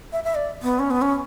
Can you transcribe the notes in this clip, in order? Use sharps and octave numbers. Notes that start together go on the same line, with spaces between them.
E5
E5
D5
B3
C#4
B3
C#4